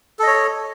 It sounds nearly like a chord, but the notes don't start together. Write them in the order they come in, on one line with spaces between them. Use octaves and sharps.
A4 D#5 C#5